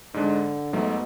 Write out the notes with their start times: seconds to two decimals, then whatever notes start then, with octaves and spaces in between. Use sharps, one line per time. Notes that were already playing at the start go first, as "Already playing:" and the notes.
0.14 G#2 D3 G#3 D4
0.73 G#2 B2 F#3 A3